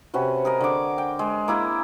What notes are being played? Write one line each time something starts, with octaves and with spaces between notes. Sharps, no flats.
C3 C#4 F#4 B4
G#4 A#4 D#5
D3 F#5 D6
G5
G#3
A#3 E4 G#4